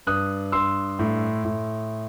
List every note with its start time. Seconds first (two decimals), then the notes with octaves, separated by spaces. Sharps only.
0.07 G2 D#6 F#6
0.52 G2 C6 E6
0.99 A2
1.45 A2